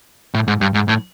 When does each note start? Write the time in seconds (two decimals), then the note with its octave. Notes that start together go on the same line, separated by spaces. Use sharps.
0.34 A2
0.48 G#2
0.61 G2
0.74 G#2
0.88 A2